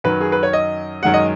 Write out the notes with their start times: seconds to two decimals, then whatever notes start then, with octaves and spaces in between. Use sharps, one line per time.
0.04 F#2 D#3 F#3 B4
0.21 G#4
0.32 B4
0.43 C#5
0.53 D#5
1.03 F#2 D#3 G#3 F#5
1.14 D#5